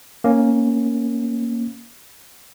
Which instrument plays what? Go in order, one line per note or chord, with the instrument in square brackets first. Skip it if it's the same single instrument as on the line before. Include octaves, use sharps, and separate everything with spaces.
[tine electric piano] A#3 C#4